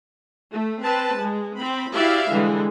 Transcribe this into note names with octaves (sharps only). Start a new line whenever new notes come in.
A3
C4 B4 A5
G#3
C4 B5
E4 F#4 G4 D5 E5 F5
D3 E3 G3 G#3